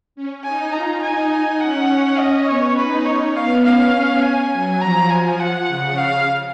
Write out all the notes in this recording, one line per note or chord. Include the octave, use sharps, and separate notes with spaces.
C#4
D#4 G#5
F4 A#5
D#4 G#5
D#4
C#4 F#5
C#4
D#5
B3 C#5
D#4 B4
C#4 C#5
B3 F5
C#4 F5
G#5
F#3
F3 A#5
G#5
F#5
C#3
C#3 F5